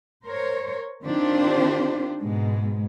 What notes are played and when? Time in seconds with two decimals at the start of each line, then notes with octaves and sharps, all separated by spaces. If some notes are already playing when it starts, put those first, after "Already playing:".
0.24 A#4 C5 C#5
1.05 D#3 C4 D4 F4 G4 C5
2.21 G#2 B2 G#3